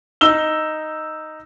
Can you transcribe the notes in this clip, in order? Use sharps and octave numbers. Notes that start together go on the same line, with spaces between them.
D#4 E6 G7